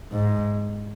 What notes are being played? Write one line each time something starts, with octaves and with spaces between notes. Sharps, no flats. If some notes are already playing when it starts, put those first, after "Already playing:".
G#2